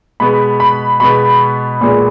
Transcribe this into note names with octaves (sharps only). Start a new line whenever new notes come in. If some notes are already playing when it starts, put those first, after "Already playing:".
B2 G#3 B3 B5
B5
B2 G#3 B3 B5
A#2 G#3 B3